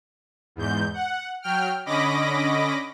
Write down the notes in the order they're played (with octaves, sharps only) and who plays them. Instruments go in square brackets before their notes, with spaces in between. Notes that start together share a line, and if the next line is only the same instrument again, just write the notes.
[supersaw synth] E2 G#2 G6
F#5
F#3 G5 F6
D3 C#4 D#5 B5 D6 A#6